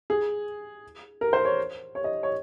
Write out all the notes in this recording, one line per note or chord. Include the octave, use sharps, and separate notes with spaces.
G#4
A#4
C5
C#5
C#5
D#5
C#5